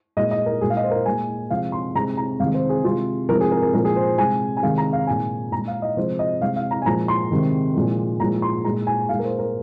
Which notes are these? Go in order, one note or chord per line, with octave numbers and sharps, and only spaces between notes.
A#2 G#3 D#5
D#5
A#4
A#2 G#3 G#4
F5
D#5
C5
A#4
A#2 G#3 G#5
C3 F3 G#3 F5
C6
C3 G#3 A#5
A#5
C3 D#3 G#3 F5
C5
G#4
C3 G#3 F4
C3 F3 G#3 A#4
G#4
A#4
A#4
A#2 F3 G#3 A#4
G#4
C5
C3 G#3 G#5
G#5
C3 D#3 G#3 F5
A#5
F5
A#2 G#3 G#5
A#2 G#3 A#5
F5
D#5
C3 F3 G#3 C5
D#5
C3 G#3 F5
F5
A#5
G#5
A#2 F3 G#3 A#5
C6
C3 D#3 G#3
A#2 F3 G#3
A#2 F3 G#3 A#5
C6
A#2 G#3 A#5
G#5
A#2 G#3 F5
A#4
C5
A#4